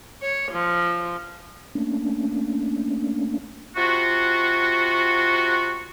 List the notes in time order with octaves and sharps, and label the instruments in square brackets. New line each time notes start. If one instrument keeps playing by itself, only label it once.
[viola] C#5
F3
[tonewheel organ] A3 A#3 C#4 D4
[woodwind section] C3 F4 F#4